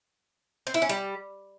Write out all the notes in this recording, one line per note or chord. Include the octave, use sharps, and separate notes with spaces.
C4
E4
C#4
G3